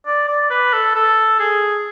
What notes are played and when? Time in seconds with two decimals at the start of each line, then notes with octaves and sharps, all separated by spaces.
0.07 D5
0.28 D5
0.50 B4
0.73 A4
0.95 A4
1.40 G#4